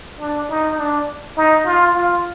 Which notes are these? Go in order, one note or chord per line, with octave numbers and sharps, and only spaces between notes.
D4
D#4
D4
D#4
F4
F4